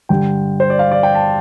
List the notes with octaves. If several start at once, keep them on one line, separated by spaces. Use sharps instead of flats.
G2 D3 G3 G5
C5
D5
F5
D5
G5
A5